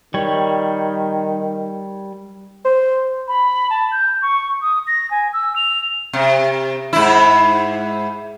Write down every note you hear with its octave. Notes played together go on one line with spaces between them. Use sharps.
D#3 G3 C#5
C5
B5
A5
G6
C#6
D#6
A#6
G#5
E6
F7
C3
G#2 E4